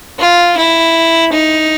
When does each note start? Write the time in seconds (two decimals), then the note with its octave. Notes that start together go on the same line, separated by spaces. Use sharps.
0.20 F4
0.57 E4
1.32 D#4